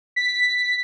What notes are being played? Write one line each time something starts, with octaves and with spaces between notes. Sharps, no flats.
B6